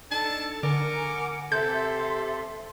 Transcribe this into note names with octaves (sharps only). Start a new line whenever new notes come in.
D4 D#4 A4 A5
D3 A#4 F#5 G#5 D6
C3 A4 E5 C6 G6